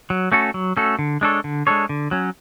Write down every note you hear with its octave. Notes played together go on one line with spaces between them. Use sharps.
F#3
A3 C#4 F#4 A4
F#3
A3 C#4 F#4 A4
D3
G#3 D4 A4 C#5
D3
G#3 D4 A4 C#5
D3
F#3 C#4